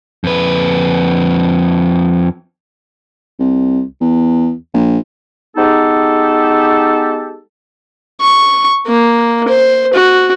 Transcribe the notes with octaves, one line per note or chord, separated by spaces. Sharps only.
F2 B4
C2
E2
A#1
G#3 B3 D#4 G4 A4
C#6
A#3
C5
F#4